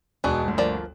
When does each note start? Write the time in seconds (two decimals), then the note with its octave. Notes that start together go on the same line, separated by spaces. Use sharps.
0.24 E1 B2 G#3 D4 F#6
0.44 G1 D2
0.58 F3 A#3 D5